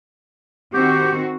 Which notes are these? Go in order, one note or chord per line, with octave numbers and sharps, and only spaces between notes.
D#3 C4 F#4 G4